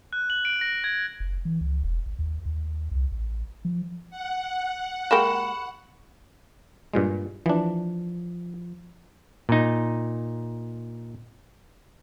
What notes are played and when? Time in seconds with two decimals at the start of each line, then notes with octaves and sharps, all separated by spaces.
0.13 F#6
0.30 F#7
0.45 D7
0.61 A#6
0.84 G#6
1.20 F#1
1.45 E3
1.61 C#2
1.83 E1
2.06 G#1
2.19 D#2
2.46 D#2
2.92 C2
3.12 A1
3.65 F3
4.10 F#5
5.11 G#3 A#3 G4 B5 C#6 E7
6.94 G2 A#2 G#3
7.46 E3 F3 D4
9.49 A#2 D#4